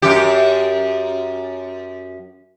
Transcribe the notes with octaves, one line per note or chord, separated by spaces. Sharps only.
F#2 G4